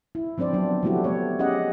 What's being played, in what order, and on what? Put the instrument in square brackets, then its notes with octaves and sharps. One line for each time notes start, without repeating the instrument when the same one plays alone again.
[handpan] E4
F3 C4 D4 C5 D5
F#3 B3 D4
F3 G3 A3 E4 F#4 G4
A3 B3 C#5
C#4 G4 G#4 D#5 F#5